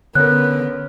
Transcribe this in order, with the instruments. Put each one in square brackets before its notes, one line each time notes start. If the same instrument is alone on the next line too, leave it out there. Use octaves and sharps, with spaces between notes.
[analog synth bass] D3 [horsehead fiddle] B3 [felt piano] C#4 A#4 [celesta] F#6